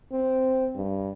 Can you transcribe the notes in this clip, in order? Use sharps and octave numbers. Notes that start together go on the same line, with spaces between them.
C4
G2